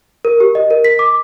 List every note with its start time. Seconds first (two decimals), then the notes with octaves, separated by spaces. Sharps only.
0.25 A#4
0.40 G4
0.55 D#5
0.71 A#4
0.85 B6
0.99 D6